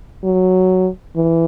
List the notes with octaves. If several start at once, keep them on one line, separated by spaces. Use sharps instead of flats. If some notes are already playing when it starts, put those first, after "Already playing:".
F#3
E3